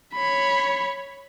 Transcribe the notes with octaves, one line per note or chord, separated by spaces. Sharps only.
C#5 B5